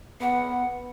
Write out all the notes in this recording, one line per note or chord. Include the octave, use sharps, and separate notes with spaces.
B3 F#5